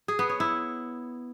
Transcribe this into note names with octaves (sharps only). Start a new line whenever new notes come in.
G#4
B3
C#5
E4